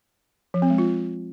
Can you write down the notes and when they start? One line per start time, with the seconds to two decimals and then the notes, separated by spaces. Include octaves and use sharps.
0.54 F3
0.62 C4
0.70 G#3
0.78 F4